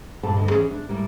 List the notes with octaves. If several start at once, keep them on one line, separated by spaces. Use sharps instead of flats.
G2 A#2 A4 A5
D2 G2 D#5
D#3 E3 C#4 G#4
D4
A2 G3 A#3